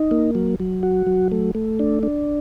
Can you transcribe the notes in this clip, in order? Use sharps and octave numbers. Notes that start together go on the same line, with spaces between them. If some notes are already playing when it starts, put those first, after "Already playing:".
Already playing: D#4
A#3
F#3
F#3
F#4
F#3
A3
A3
D4
D4